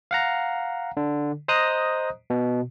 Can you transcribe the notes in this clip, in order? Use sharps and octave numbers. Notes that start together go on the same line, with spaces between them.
F5 F#5 A#5
D3
C5 D#5 A#5 D#6 F#6
B2